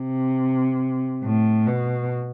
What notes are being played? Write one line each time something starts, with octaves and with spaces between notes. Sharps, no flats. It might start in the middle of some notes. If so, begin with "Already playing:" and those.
Already playing: C3
A2
B2